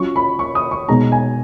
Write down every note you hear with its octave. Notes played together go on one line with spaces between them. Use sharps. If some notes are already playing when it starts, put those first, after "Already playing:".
Already playing: F#3 C#4 F4 C#6
B5
C#6
D#6
C#6
B2 G#3 D#4 A#5
G#5